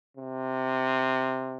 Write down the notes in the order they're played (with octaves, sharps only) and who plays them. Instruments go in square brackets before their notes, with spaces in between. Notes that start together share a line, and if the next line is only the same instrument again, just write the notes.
[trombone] C3